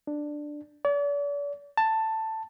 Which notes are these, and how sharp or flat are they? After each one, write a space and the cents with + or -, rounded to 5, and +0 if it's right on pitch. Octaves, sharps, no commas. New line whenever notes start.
D4 +10
D5 -40
A5 +10